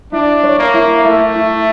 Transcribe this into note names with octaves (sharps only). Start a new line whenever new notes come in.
D4 E4
C#5
A#3
E4
A3 E4
E4